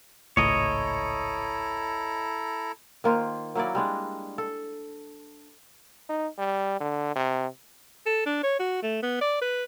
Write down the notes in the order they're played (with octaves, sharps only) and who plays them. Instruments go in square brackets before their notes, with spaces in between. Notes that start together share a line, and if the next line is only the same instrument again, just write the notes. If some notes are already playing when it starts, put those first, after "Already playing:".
[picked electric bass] G#1 C#2 A2 [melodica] E4 A4 A#5 [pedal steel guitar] C#5 D#5
[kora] D#3 A#3 F4 C5
F#3 A#3 E4 D5
G3 G#3 D4
A4
[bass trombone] D#4
G3
D3
C3
[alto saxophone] A4
D4
C#5
F#4
A3
B3
D5
B4